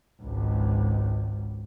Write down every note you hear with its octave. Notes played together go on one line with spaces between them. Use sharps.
G#1 C#2